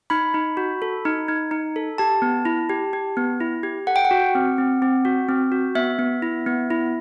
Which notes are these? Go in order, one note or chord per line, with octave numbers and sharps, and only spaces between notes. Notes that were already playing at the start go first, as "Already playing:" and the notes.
D#4 B5
D#4
F#4
A4
D#4
D#4
D#4
A4
G4 A5
B3
E4
G4
G4
B3
E4
G4
A4 F#5
G5
F#5
F#4
C4
C4
C4
F#4
C4
F#4
B3 E5
B3
E4
B3
E4